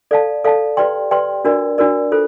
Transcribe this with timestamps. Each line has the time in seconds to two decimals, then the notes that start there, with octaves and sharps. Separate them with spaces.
0.11 A4 D5 F5 A5
0.44 A4 D5 F5 A5
0.77 G4 B4 D5 G5 C6
1.11 G4 B4 D5 G5 C6
1.45 D4 F#4 A#4 D5
1.78 D4 F#4 A#4 D5
2.12 F4 A4 C5